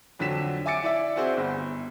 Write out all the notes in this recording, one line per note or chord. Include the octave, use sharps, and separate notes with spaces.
F2 D3 F#3 B6 E7
E5 G#5 D6 A6 C#7 D7
E4 D5 E5
C4 E4 F#4 G#4 C5
G1